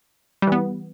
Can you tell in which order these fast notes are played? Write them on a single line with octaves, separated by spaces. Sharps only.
G3 E3 B3